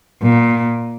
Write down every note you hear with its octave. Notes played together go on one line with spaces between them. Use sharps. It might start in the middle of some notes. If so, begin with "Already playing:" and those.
A#2